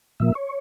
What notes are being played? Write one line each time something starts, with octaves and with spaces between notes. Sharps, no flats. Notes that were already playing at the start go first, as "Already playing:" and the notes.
A#2 F3 A#3 E5
C#5